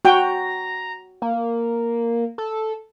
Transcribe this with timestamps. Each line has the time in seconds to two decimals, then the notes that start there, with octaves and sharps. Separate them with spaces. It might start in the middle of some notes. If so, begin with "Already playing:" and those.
0.05 F#4 G5 A#5
1.22 A#3
2.38 A4